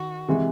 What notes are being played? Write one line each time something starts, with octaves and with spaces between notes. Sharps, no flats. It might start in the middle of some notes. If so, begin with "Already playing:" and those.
Already playing: D#3 F#4
C3 E3 G#3